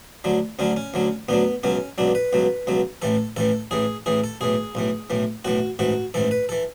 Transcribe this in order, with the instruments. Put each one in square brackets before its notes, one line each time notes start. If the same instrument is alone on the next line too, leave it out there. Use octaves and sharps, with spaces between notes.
[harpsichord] D2 D3 F#3
D2 D3 F#3 C#4
C#4
D2 D3 F#3
D2 D3 F#3 B3
C#2 B2 F#3 C#4
C#2 B2 F#3 D4
B4
C#2 B2 F#3
C#2 B2 F#3
A1 A2 E3 A4
A1 A2 E3 A4
A1 A2 E3 G#4
A1 A2 E3 G#4
A4
B1 A2 E3 G#4
B1 A2 E3
B1 A2 E3
B1 A2 E3 F#4
A1 G#2 E3 F#4
A1 G#2 E3 A4
B4
E3 A4